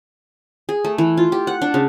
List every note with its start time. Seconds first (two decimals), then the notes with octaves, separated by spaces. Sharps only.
0.69 G#4
0.85 A3
0.98 E3
1.17 F4
1.32 G4
1.47 F#5
1.62 D4
1.74 C#3